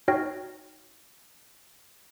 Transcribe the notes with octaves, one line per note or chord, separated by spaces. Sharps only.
D#4 F#4 C#5 G5 F6 A#6